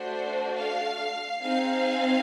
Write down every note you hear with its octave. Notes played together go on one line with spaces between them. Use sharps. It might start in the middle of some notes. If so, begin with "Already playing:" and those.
Already playing: A3 D4 F#4 C5
F5
C4 D#4 G#4 F5